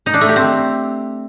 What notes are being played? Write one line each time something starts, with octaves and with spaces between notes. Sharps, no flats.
D#4
D4
A3
G4
C4